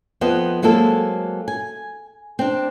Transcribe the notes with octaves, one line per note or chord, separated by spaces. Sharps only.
F2 B3 C5 D#5
F#3 G#3 A#3 C4 A4
G#5
C4 D4